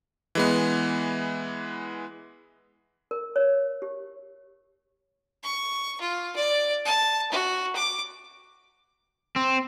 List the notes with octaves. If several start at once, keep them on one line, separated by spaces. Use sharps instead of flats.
E3 G#3 B3
A#4
C#5
G4
C#6
F4
D5
A5
F#4
D6
C4